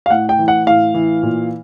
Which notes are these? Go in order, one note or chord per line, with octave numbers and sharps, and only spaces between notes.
F5
A2 F#5
G5
E3
F#5
A2 F5
E3
A#2